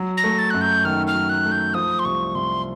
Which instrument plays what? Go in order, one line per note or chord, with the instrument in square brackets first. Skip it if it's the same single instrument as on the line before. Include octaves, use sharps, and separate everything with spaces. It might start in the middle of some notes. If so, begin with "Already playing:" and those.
Already playing: [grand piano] F#3
[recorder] A#6
[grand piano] A3
[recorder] A6
[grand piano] F#2 [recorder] F#6
[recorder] G6
[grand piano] D#3 [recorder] F6
[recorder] F6
[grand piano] F#3
[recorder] F#6
[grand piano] A3
[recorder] G6
[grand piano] F3 [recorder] D#6
[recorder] C6
[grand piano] C2 [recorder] C#6
[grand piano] C2 [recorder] C6